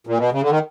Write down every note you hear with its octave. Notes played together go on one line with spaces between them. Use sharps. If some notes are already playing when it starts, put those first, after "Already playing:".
A#2
B2
C#3
D3
D#3